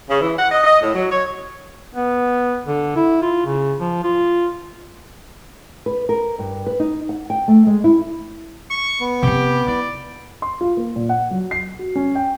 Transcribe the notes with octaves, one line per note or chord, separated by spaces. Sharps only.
C#3
E3
F#5
D#5
D#5
A2
F#3
C#5
B3
D3
E4
F4
C#3
F3
F4
B4
A#4
G2
B4
D#4
F#5
G5
A3
G#3
E4
C#6
B3
C3 C4 G4
E4 D5
C6
F4
A#3
A#2
F#5
F#3
C7
F#4
C#4
G5